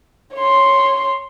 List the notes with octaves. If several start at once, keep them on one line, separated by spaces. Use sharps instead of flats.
C#5 C6